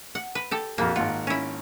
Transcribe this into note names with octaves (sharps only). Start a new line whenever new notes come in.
F#5
B4
G4 A4
A#1 F2 A#3 F#4
G#1 A#3 F4 F#5
C#4 E4